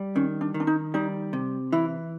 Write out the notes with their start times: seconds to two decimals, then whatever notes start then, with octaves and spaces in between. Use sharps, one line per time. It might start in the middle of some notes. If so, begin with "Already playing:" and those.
Already playing: G3
0.15 D#3 C#4
0.41 D4
0.54 D#3
0.60 D4
0.67 D#4
0.94 G3 D#4
1.33 C3
1.72 E3 E4